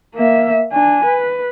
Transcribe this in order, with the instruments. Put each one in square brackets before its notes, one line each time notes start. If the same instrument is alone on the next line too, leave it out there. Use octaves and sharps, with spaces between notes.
[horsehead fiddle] A#3 E5
D4 G#5
B4